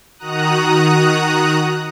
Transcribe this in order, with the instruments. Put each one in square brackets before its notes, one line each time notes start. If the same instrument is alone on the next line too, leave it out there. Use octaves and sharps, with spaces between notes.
[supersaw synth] D#3 F#4 A#5 D#6 F#6